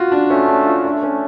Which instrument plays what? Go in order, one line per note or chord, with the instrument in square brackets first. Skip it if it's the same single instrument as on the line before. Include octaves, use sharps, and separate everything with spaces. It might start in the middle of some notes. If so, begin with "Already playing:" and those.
Already playing: [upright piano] F4 F#4
D4
[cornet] A3 [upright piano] C#4
[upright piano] D4
F4
[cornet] A3 [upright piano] D4
[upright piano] C#4